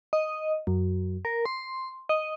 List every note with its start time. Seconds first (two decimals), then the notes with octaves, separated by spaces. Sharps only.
0.13 D#5
0.67 F#2
1.25 A#4
1.46 C6
2.09 D#5